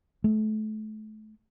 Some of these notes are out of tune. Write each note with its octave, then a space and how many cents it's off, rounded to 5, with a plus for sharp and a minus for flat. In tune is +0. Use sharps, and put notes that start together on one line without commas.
A3 -30